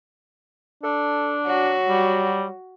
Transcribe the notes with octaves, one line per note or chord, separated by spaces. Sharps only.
D4 A4
F#3 F#4
G3